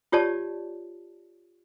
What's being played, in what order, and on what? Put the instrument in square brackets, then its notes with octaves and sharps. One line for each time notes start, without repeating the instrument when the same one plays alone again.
[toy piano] F4 G4 C#5 D5 A5